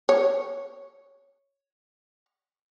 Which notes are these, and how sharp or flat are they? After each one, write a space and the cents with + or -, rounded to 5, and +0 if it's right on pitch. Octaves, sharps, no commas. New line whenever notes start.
C#5 +5